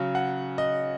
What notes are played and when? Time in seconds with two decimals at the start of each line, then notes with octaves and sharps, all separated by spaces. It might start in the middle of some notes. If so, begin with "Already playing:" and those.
Already playing: C#3 F#3
0.15 F#5
0.58 D#5